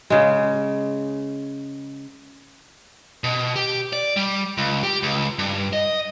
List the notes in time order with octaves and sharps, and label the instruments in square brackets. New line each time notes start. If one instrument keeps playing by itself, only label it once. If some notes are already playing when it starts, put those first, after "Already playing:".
[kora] C#3 G#3
[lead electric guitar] B2
G4
D5
G3
C#2
G4
C#2
G2
D#5